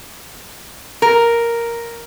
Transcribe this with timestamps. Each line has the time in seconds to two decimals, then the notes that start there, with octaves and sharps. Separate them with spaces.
1.02 A#4